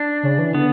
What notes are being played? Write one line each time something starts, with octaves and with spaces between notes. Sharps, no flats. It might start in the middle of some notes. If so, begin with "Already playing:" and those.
Already playing: D4
C#3
E3
D3 B3